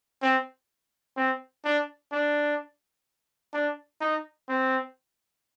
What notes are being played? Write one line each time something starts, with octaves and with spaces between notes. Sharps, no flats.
C4
C4
D4
D4
D4
D#4
C4